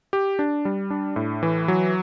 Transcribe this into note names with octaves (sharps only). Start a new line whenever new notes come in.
G4
D4
G3
D4
A2
E3
F#3